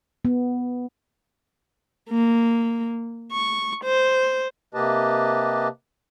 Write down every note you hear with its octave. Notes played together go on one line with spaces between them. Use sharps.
B3
A#3
C#6
C5
C3 A#3 G4 B4 D#5 A5